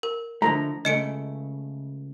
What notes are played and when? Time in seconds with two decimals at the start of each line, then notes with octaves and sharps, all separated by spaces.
0.03 A#4
0.42 D3 F3 A3 A#5
0.85 C#2 C#3 A3 D#5 C#7 D7